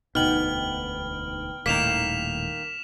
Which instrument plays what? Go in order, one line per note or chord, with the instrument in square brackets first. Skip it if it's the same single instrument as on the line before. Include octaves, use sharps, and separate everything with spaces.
[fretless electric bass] E1 D2 B2 [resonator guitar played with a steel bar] B3 [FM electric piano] D#4 G5 [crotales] F6 F#7
[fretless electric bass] D#1 A2 [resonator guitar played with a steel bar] D#3 A#3 [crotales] B6 E7 F7